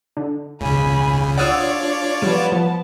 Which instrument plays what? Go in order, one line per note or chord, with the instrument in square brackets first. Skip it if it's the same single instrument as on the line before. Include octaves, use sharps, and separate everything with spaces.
[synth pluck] D3
[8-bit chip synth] C#2 C#3 [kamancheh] G#5 B5
[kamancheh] D4 [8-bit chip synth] F4 C#5 D5 [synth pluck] F#5 D#6 E6
[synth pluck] F3 G3 D7 [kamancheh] B3 A5
[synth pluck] F3